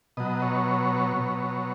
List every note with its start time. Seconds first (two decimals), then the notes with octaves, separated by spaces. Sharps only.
0.17 B2 F#3 D#5
0.42 C#5
1.16 B2 F#3